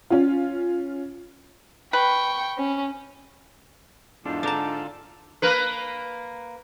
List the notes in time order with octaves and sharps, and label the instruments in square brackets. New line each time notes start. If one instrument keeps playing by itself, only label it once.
[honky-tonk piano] C#4 F4
[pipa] B4 [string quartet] G5 C#6
[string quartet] C#4
[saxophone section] E2 G#2 [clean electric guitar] D4 [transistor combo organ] F4 A4
[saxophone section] G#2 D3 [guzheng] D4 A5 [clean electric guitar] D#4 D5 A#5
[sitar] A#3 A#4 B4